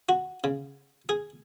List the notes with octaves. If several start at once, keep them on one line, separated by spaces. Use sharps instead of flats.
F#4
C#3
G#4